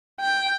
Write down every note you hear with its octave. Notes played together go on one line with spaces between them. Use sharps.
G5